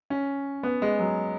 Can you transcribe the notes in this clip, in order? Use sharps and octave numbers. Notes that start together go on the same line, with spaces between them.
C#4
B3
G#3
F#3